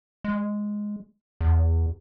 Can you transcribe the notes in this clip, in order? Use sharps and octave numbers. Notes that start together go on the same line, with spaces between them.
G#3
E2